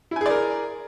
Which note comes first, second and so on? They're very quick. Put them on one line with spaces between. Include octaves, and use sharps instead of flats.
E4 G#5 G#4 D5 A#4